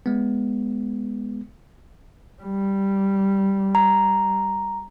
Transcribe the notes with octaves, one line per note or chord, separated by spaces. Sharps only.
G#3 B3
G3
A#5